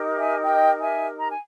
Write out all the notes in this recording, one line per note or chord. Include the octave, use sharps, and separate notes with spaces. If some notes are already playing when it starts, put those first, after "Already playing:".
Already playing: D#4 G4 A#4
E5 G#5
D#5 G5
E5 G#5
A#5
G#5